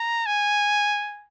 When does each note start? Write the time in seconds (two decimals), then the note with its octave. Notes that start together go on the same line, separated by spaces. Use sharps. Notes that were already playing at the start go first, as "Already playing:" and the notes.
Already playing: A#5
0.26 G#5